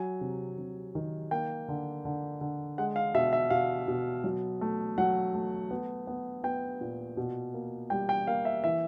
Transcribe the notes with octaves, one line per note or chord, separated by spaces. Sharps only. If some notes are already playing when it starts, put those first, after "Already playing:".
Already playing: F#3 G#5
C3
C3
D#3
A#3 G5
D3
D3
D3
G#3 F#5
F5
B2 E5
E5
B2 F5
B2
F#3
A3
F#3 F#5
A3
B3
B3
B3 G5
A#2
B2
A#3
G3 G5
G5
A#3 F5
E5
E3 E5